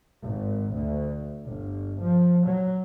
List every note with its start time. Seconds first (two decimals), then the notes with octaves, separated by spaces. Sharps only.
0.23 G#1
0.73 D2
1.45 G1
2.02 F3
2.46 F#3